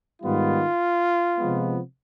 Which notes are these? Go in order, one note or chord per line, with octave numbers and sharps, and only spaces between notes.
G#2 D#3 G3 B3 F4
C3 F3 G#3 B3